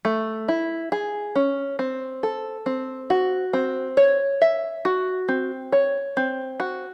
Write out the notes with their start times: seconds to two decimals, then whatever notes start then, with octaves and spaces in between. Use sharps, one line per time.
0.05 A3
0.48 E4
0.92 G#4
1.35 C#4
1.79 C4
2.23 A4
2.66 C4
3.10 F#4
3.53 C4
3.97 C#5
4.42 E5
4.85 F#4
5.28 C4
5.72 C#5
6.17 C4
6.60 F#4